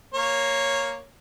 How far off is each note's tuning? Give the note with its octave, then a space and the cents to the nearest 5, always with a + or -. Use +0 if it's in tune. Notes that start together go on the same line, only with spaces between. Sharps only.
A#3 +0 C#5 +0